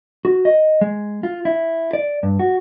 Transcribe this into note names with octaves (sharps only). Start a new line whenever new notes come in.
F#4
D#5
G#3
F4
E4
D5
G2
F#4